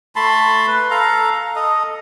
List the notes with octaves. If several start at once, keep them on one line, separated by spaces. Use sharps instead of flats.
A3 A5 B5 C6
B4
A4 F5 A#5
A4 D#5